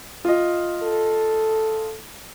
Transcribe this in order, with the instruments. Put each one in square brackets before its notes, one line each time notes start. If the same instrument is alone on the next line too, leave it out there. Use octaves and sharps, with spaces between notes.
[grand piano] F4 D#5
[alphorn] A4